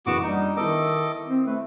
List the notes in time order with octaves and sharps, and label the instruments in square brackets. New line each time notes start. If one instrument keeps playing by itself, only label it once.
[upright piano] F#1 E3 E7 [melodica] B3 F#4 D6
[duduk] G3 [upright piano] D4 [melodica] D#4
[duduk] D#3 [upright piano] B3 E4 [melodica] A4 D#5 D6
[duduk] C4
[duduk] A3 [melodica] B4